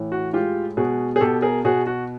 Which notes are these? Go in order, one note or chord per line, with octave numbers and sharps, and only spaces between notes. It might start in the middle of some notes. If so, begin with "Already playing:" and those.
Already playing: A2 E3
F#4
G#3 F4 G4
B2 F#4 G#4
G#4
B2 G4 A4
G#4 A#4
B2 F#4 G#4
F#4